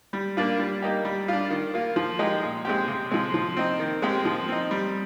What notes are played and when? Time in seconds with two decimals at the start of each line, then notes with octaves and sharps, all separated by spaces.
0.13 G3
0.37 A#3 D4 F4
0.59 G3
0.82 A#3 D#4 G4
1.05 G3
1.28 D4 F4
1.50 D#3
1.74 A#3 F4
1.96 F3
2.19 G#3 D#4 G4
2.43 A#2
2.65 G#3 C4 G4
2.88 C3
3.11 F3 G#3 C4
3.34 F3
3.57 C4 D#4
3.79 D#3
4.02 G#3 C4 G4
4.25 F3
4.48 C4 D#4
4.71 G3